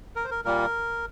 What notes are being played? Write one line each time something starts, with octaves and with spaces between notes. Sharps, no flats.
A#4
C5
A#4
A#2 G3 A#3 A#4